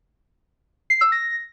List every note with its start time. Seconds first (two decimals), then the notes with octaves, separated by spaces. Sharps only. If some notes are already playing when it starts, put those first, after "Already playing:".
0.90 C7
1.01 E6
1.12 A#6